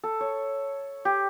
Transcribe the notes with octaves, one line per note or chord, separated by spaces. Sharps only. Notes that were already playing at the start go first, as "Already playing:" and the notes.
A4
C#5
G4